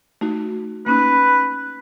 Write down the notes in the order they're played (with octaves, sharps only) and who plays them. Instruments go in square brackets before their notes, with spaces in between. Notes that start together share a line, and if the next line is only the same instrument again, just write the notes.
[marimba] A3 D#4 F#4
[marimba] A#3 C#4 D#4 [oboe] B4